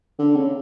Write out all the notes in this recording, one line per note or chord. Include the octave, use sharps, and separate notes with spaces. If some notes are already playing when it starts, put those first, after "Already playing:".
D3
C#3